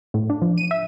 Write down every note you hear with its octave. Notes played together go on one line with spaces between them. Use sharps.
A2
D4
F3
D#7
E5